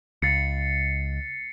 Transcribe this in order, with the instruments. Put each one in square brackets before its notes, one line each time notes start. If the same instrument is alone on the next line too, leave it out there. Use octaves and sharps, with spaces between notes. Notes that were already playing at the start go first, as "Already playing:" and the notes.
[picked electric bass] C#2 [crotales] A6 C7 C#7